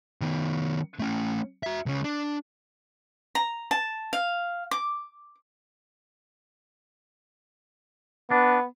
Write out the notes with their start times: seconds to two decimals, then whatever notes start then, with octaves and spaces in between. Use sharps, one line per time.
0.21 D#3 B3
1.00 A3 C#4
1.63 F#4 E5
1.86 C#2 C#3
2.04 D4
3.35 A#5
3.71 A5
4.13 F5
4.71 D6
8.31 B3 D4